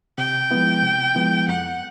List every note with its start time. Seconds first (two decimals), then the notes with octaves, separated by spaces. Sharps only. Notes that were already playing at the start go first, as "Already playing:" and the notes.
0.18 C3 G5
0.51 F3 G#3 B3 E4
0.83 C3
1.15 F3 G#3 B3 E4
1.48 F2 F#5